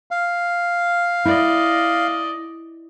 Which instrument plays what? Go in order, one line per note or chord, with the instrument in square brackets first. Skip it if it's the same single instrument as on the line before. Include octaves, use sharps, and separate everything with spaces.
[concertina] F5
[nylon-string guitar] E4 [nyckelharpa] D5 D#5